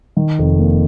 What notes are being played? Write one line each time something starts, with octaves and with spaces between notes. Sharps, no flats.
D#3
F1
A#3